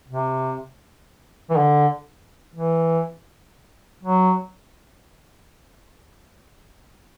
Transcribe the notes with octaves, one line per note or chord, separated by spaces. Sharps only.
C3
E3
D3
E3
F#3